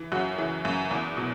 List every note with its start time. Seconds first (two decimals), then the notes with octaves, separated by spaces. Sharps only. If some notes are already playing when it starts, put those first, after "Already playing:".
Already playing: E3
0.12 F#2 F#4
0.38 E3
0.65 F#2
0.91 E2
1.17 B2